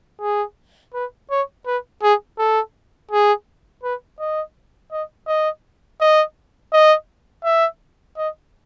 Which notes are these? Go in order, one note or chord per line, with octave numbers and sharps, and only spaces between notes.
G#4
B4
C#5
B4
G#4
A4
G#4
B4
D#5
D#5
D#5
D#5
D#5
E5
D#5